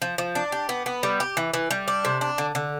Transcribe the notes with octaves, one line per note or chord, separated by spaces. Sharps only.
F3
F3
D4
G4
B3
B3
G3
G4
E3
E3
G3
D4
C3
D4
D3
D3